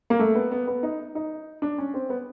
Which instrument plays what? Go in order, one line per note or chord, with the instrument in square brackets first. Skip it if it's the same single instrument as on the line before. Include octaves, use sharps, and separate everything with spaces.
[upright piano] A#3
A3
B3
B3
B3
D#4
D#4
D4
C#4
C4
B3